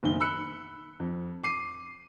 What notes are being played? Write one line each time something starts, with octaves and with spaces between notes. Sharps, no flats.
F#1 B1 D#3 G7
B5 E6 F#6 C#7
F2
D6 C7 D#7